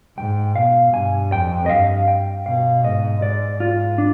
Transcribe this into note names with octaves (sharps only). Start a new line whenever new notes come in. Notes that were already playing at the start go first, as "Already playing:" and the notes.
G#2 G5
B2 F5
G2 G#5
F2 G5
D#5
G2 F5
G5
B2 F5
G#2 D#5
G#2 D5
F4
D4